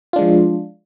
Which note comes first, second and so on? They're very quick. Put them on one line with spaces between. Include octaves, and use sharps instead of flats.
F4 D4 G#3 F3